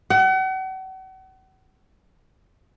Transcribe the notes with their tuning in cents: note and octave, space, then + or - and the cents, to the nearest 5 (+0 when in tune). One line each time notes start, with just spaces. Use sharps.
F#5 +40